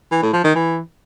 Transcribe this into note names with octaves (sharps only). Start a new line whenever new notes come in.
E3
A2
F3
D#3
E3